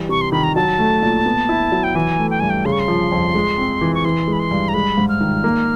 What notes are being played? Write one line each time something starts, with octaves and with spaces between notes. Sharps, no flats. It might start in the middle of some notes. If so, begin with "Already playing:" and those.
Already playing: E3 G3
C3 C#6
C6
D#3 B5
A#5
F#3 A5
A3
A#2
B3
E4
F#3
G5
E3 G#5
A3
G5
G2 G#5
G5
C#3 C6
C#6
C6
F3
F2
G#3
C4
E3
C#6
E3 C6
G#3
B5
C6
G2
A#5
G#3 B5
G#2
F6
D#3
A#3